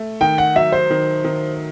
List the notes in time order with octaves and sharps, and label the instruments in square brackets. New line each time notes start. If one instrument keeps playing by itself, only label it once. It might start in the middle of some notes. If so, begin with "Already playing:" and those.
Already playing: [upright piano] A3
[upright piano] D#3 [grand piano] G5
[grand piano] F#5
[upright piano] F#3 [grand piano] E5
[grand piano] C5
[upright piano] D#3
D#3